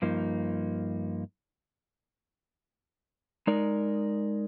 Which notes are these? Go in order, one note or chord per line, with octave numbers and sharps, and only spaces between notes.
G2 F3 A#3 D#4
G#3 D#4 A#4 D5